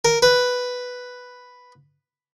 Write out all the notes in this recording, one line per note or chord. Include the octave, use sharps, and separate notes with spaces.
A#4
B4